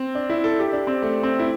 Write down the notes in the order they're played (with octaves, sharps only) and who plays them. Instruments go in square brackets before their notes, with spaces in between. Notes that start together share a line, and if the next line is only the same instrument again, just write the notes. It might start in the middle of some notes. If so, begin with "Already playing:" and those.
Already playing: [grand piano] C4
D4
E4
A4
G4
D4
C4
A3
C4
E4